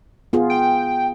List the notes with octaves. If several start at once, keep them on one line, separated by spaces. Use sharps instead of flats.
B3 F4 G#4
G5